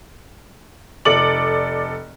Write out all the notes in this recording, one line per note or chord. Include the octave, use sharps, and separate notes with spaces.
F1 A4 D5 D6 F#7